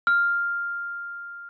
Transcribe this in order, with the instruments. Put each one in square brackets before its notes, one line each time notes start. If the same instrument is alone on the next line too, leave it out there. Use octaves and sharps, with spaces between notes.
[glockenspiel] F6